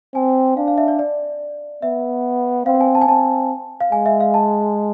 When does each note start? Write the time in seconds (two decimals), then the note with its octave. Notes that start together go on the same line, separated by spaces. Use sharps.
0.15 C4 G#5
0.57 D4 F5
0.68 F5
0.78 E5
0.88 D5
0.99 D5
1.82 B3 E5
2.66 C4 F5
2.81 G#5
2.95 A5
3.02 G#5
3.08 C4 A5
3.80 F5
3.92 G#3 G#5
4.06 E5
4.20 F5
4.34 A5